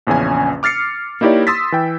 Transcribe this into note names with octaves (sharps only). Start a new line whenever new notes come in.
A#1 E2 C#3 C#4 G#5
D6 F6 A6 C7 C#7
A#3 D#4 E4 G4 C#5 D5
C6 D#6 E6 A6 B6
E3 G5